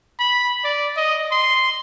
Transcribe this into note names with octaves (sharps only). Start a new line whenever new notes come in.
B5
D5
D#5
C6